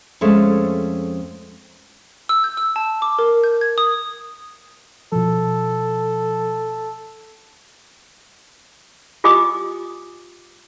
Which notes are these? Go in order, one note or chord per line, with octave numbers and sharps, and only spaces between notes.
F2 G#3 A3 C#4
E6
G6
E6
A5
D6
A#4
G6
G#6
D#6
B2 F3 A4
F4 G4 D#5 G#5 D6 D#6